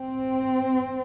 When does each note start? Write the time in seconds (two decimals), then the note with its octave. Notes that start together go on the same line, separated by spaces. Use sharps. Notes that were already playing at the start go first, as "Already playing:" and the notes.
Already playing: C4